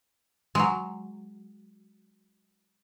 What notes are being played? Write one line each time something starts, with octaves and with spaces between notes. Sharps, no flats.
F#3 G#3